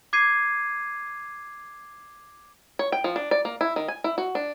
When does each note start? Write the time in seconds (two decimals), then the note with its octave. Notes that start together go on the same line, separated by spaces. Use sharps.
0.13 D6 G#6 C7 D#7
2.79 C#5
2.92 G5
3.04 F3
3.16 D4
3.31 D5
3.45 A#3
3.61 E4
3.76 D#3
3.88 G#5
4.04 E4
4.18 F#4
4.35 D4